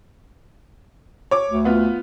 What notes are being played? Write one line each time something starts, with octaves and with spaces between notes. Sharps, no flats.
C#5 D6
D2
B3 F4